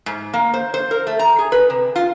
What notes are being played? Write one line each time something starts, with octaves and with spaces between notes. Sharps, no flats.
G#2
A#3
C5
C5
A#4
A3
A#5
G#4
B4
C3
F4